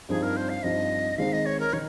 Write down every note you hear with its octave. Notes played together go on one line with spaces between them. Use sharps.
G2 F3 C4 D#4 G#4
A#4
C5
F5
G2 F3 C4 D#4 D#5
D#3 G#3 C4 D#4 F5
D#5
C#5
A#4
D#3 C#5